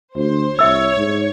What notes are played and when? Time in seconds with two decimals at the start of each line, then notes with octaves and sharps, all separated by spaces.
0.16 D2 C5
0.59 C2 C#5 E5 E6
0.97 G#2